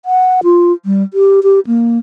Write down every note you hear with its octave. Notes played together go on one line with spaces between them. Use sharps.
F#5
F4
G3
G4
G4
A#3